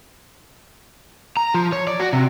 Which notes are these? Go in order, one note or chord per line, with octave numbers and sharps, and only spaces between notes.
A#5
F3
C#5
D5
F#4
C3